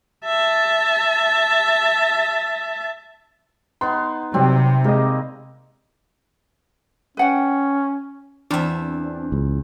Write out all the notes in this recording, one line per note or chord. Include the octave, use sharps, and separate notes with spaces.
E5 A5
B3 D#4 C6
C3 F#3 G3 C4
G#3 A#3 D#5
C#4 B4 F#5 G5
E2 C4 D4 E5
C#2